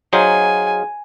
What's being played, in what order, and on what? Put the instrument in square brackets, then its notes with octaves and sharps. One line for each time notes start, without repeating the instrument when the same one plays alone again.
[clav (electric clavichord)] F#3 D#4 C5 [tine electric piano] G#4 F5 [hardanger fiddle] G#5